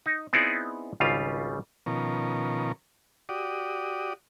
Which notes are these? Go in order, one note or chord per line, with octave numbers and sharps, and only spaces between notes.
D#4
B3 C4 D#4 E4 G#4 D5
G#1 C#2 C#3 G3 F4 F5
B2 D#3 F3 C#4 A#4
F#4 G4 D5 D#6